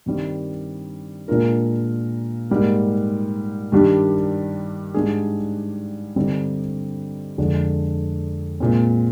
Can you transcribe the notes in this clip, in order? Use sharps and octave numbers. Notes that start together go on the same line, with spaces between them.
G2 D#3 G3 C4
A#2 G#3 D4 F4 A#4
G#2 G3 A#3
G2 D#3 G3 D4 G4
G#2 G3 D4 G#4
G2 D3 G3 C4 D#4
F2 D3 F3 G#3 D4
A#2 G#3 C4